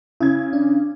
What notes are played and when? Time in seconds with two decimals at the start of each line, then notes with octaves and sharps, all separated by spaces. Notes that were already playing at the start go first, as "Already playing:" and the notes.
0.21 C#3 E4 G#6
0.53 D4